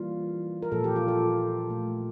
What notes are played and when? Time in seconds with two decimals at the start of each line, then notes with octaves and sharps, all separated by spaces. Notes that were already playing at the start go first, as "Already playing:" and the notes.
Already playing: E3 G3 A#3 F4
0.63 A#4
0.72 A#2 F3 A#3 A4
0.84 G4
0.96 F4
1.08 A4
1.69 A#2 A3